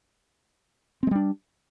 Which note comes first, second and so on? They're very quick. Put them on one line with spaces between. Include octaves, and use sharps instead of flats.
C4 G#3 G3 D4